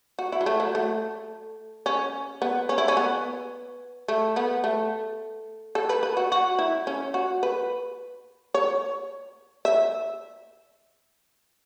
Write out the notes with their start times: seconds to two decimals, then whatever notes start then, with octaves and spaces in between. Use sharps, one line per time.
0.19 F#4
0.32 E4
0.41 F#3
0.46 A3
0.60 F#3
0.75 A3
1.86 C#4
2.42 B3
2.69 C#4
2.78 E4
2.88 C#4
2.97 B3
4.08 A3
4.36 B3
4.64 A3
5.75 A4
5.89 B4
6.03 B4
6.17 F#4
6.32 F#4
6.59 E4
6.87 C#4
7.14 F#4
7.43 B4
8.54 C#5
9.65 E5